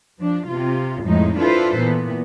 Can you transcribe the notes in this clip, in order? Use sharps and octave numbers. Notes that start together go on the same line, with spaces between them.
F3 D4
C3 F4
F2 A2 F3 G#3 D#4
D4 E4 F4 A4 B4 C5
A#2 E3 B3